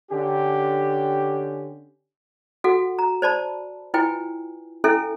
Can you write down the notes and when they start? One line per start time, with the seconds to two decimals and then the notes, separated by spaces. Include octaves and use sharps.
0.11 D3 C#4 G4
2.64 F#4 A4 F5 F#5
2.99 A#5
3.22 C5 D5 A5 B5
3.94 E4 F4 B4 G5 G#5
4.84 C#4 E4 A4 E5 G#5